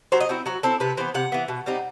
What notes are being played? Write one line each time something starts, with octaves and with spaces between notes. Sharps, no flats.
F#3 C5
D#5
C4 E4 F#4
F#3 F#4
C4 E4 A4
C3 B4
E3 B3 C5
C3 F#5
E3 B3
B2
G3 C4 D#4